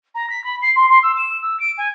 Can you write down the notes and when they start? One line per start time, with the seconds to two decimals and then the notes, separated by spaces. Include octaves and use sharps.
0.15 A#5
0.30 B6
0.44 B5
0.62 C7
0.76 C6
0.89 C6
1.03 E6
1.17 E7
1.42 E6
1.60 D7
1.78 G#5